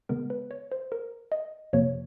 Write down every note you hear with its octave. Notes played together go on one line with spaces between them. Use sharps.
C#3 E3 G#3 B3 A#4
B4
C#5
C5
A#4
D#5
F2 C3 F3 A#3 C#5